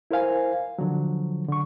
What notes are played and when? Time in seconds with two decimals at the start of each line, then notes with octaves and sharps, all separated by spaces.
0.11 E4 A#4 C5 F5 G#5
0.78 D3 F3 F#3
1.49 D3 C#6